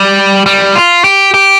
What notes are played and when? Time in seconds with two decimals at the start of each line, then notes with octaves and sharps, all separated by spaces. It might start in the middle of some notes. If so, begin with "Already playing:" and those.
Already playing: G3
0.46 G3
0.75 F4
1.04 G4
1.34 G4